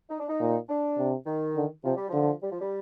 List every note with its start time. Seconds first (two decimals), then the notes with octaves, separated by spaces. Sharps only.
0.10 D#4
0.20 D4
0.29 D#4
0.40 A#2
0.69 D4
0.98 C3
1.26 D#3
1.56 D3
1.84 C3 F3
1.96 G3
2.09 D3 F3
2.42 G3
2.52 F3
2.61 G3